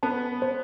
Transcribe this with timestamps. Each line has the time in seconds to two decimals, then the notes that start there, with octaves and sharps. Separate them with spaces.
0.03 B3 A5
0.42 C5